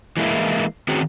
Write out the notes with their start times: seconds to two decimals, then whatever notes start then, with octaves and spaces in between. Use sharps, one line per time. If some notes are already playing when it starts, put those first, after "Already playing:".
0.17 E3 G#3 A#3 E4
0.88 D#3 C4 C#4 F#4 G#4